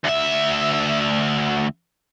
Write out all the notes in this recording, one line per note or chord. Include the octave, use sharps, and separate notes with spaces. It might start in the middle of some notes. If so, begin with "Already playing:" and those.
D2 E5